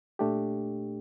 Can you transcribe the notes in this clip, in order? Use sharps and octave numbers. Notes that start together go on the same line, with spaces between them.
A#2 A3 D4 G4